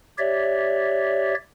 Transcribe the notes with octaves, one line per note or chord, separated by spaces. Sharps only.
G4 C#5 D5 E5